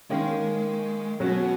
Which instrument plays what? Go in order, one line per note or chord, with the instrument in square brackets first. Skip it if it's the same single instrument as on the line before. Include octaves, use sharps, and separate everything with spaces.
[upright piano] D#3 A#3 C#4 [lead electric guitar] G#3
[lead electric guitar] B2 [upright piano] F#3 C#4 F#4